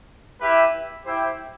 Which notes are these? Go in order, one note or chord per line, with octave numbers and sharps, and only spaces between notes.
E4 G4 B4 E5
E4 G4 C5 E5 G5